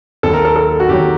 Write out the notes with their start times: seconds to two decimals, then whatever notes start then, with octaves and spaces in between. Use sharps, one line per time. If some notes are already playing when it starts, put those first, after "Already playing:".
0.23 D#2 D#3 F#3 A4
0.34 A#4
0.45 A4
0.56 A4
0.80 F#4
0.89 D#2 D#3 F#3 G4